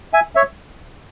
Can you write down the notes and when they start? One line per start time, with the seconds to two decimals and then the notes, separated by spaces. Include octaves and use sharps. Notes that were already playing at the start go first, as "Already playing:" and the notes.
0.13 E5 G#5
0.35 C#5 E5